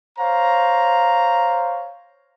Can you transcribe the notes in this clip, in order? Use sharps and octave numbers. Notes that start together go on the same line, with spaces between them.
C5 C#5 F5 A#5